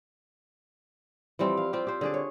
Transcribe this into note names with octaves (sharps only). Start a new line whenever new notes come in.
E3 F3 G3 C4
F5
C4 F4 G4
G4 C5
D3 G#4 D5
C#5